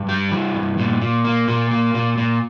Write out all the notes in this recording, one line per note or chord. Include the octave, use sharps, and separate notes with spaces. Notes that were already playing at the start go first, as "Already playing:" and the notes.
Already playing: G2
G3
E3
G2
A#2
A#2
A#3
A#2
A#3
A#2
A#2